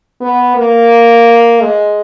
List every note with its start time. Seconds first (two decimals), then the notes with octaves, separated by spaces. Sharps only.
0.21 B3
0.56 A#3
1.61 G#3